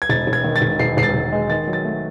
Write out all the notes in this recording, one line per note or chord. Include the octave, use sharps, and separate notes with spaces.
G#6
E1 A6
E1
G#6
D#3
A6
E1
E1 C7
E1 C7
A6
E1
G#3
D#3 A6
F#3
A6
A3